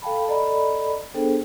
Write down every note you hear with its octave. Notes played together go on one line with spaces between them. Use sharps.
A4 F5 G5 A5 B5
A4 D5 D#5 A#5 B5
B3 D4 G#4 A4 C5 G5